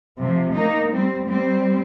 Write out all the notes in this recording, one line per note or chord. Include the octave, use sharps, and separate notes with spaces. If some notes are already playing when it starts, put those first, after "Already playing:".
C3 F3
A#3 D#4
G3 C4
G3 C4